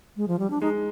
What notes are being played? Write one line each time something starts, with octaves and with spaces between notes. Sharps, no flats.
G#3
F3
G3
D4
G#3 D#4